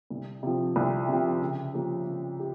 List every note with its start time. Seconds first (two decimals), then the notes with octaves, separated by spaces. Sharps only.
0.10 C2
0.43 C3 F3
0.76 C2
1.08 C3 F3
1.41 C#3
1.74 F3 A#3 C#4 G4
2.06 C#3
2.39 G4